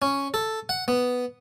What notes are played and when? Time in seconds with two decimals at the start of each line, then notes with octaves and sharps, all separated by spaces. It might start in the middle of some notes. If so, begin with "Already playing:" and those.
0.02 C#4
0.34 A4
0.69 F#5
0.88 B3